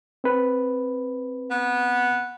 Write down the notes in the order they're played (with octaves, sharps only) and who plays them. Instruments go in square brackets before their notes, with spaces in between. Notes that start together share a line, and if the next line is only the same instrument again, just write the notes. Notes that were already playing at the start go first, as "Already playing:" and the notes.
[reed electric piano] C4 B4
[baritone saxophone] B3